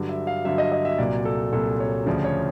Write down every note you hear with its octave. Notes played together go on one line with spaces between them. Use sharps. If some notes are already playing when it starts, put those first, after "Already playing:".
Already playing: G2 D3 F#3
E5
F5
G2 D3 F#3 E5
D#5
D#5
E5
C2 A#2 F#3 D5
A4
C2 A#2 F#3 A4
C#5
D2 C#3 F3 D5
C#5